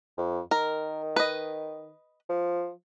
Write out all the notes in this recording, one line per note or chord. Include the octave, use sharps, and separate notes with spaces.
F2
D#3 A#4
B4 D#5
F3